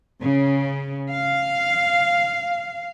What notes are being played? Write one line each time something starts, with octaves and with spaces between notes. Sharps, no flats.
C#3
F5